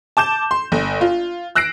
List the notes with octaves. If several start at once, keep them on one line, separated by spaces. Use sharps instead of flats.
A5 D6 G6 E7
C6
G1
F4
E6 F#6 A#6 C7 D7